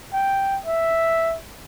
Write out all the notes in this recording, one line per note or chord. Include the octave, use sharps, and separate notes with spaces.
G5
E5